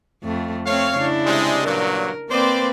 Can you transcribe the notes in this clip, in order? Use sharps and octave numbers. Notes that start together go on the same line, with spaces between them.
F2 A3
A3 C4 C#5 F5
C#3 D4 E4
C3 G3 G#3
G2 A#2 F#3 A#4
A#3 C4 B4 C5 D5